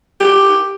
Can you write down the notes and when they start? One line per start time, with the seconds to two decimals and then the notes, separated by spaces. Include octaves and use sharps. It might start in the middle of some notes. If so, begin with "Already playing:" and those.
0.21 G4